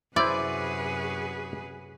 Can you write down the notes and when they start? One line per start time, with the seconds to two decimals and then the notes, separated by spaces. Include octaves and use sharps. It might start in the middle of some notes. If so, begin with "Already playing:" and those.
0.16 F#2 C3 E4 F#4 G#4 B4 C5 D5